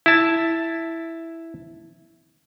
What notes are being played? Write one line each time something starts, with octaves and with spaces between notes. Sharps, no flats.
E4 A5